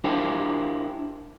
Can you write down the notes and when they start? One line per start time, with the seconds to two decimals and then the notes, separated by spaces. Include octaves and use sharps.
0.04 D4 E4 F4 G4 A#4 C5